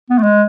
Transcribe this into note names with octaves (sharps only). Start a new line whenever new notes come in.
B3
A3
G#3